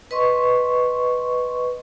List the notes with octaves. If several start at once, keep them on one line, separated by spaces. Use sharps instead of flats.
B4 D#5 C6 C#6